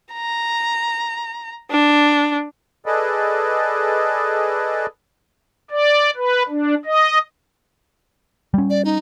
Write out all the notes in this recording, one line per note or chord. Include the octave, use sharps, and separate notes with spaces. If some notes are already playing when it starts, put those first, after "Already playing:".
A#5
D4
G#4 A4 B4 D5 D#5
D5
B4
D4
D#5
G3 C#4
D5
D#4